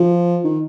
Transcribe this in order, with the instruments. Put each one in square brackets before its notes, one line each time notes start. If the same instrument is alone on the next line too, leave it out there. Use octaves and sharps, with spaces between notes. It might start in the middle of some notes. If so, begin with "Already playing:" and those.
Already playing: [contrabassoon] F3
D#3